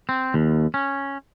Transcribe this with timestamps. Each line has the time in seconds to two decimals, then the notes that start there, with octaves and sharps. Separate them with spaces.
0.09 C4
0.34 D#2
0.74 C#4